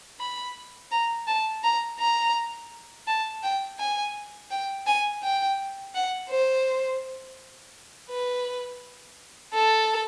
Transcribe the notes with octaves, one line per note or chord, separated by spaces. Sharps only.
B5
A#5
A5
A#5
A#5
A5
G5
G#5
G5
G#5
G5
F#5
C5
B4
A4